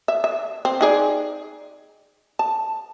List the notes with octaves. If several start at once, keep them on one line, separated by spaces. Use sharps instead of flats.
E5
E5
C4
D#4 G#4 D5
A5